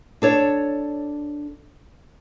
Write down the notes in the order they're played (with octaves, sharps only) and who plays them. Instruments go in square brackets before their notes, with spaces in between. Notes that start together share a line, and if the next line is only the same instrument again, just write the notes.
[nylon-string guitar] D4 A4 C#5